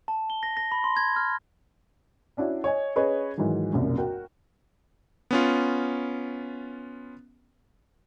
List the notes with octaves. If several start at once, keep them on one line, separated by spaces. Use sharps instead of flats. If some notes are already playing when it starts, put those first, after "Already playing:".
A5
G7
A#6
A#6
B5
C6
G#6
F6
C#4 D4 E4 F#4
C#5 D#5 G#5
C#4 G#4 B4 C#5 D#5
G#2 D#3 E3 F#3
E1 C2 F#2 A#2
F#4 A#4 G5
B3 C#4 F4